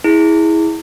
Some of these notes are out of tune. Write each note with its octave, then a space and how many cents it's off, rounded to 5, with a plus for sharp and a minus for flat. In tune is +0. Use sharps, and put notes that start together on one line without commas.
E4 -20 G#4 +0